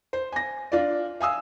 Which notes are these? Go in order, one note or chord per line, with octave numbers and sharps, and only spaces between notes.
C5
G#5 A#6
D4 F4 D5
F5 G#5 D#6 E6